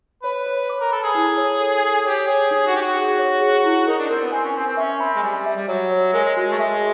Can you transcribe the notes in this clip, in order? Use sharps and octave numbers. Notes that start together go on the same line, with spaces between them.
B4 C#5
C#5
D6
A#4
A4 B5
G#4
E4
C#5
A4
A4
G4 C#5
G#4 C#5
D#4 G#4
F#4
D#4 G4
F#4
G#4
C#5
G#4
E4
D#4 A#4
D4
C4 A#4
B3
C4 G#5
C#4
C4 G#5
C4
C#4 E5
C4 B5
G#3
G3 G#5
E5
G3
F#3 C#5
C#5
G#3 A#4
G#3
G#3 F#4
A3
G#3 E5